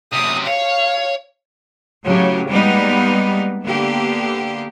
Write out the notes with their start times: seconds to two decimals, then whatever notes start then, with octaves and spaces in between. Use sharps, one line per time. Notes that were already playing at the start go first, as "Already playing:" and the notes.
0.13 F#2 C3 D#6
0.47 C#5 F5
2.06 A2 C#3 F#3 G4
2.49 G3 G#3 A#3 B3 D#4
3.64 D3 A#3 B3 G4